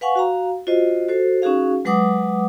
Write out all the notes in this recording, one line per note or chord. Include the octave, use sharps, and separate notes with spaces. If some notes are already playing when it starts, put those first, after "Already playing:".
B4 F5 F#5 G#5 C#6
F#4 F5 A#5
F4 F#4 C5 D#5
F#4 A4 C5
C#4 D#4 F#4 G#4 F5
F#3 G#3 B4 F#5 D6 D#6